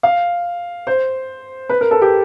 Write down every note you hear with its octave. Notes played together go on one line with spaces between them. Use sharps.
F5
C5
B4
A#4
A4
G4